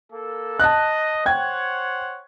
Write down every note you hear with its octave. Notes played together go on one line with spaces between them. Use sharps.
A#3 A4
D#5 A5 F#6
C5 C#5 F#5 G5 G#6